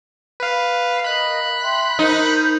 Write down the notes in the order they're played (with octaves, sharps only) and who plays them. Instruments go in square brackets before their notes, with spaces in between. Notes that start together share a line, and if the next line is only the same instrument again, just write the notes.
[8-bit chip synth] B4 F5
[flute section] A#4 D#5 F5 [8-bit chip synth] B5 F#6
[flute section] E5 G5 C6
[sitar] D#4 [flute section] A#4 C5 G6